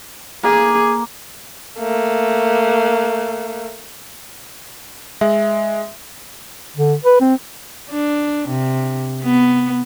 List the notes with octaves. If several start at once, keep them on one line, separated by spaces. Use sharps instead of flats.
A#3 G#4
A3 A#3
G#3 E5
D3
B4
C4
D4
C3
B3